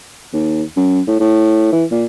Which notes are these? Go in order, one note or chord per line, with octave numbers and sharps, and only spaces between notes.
D#2
F#2
A2
A2
E3
A#2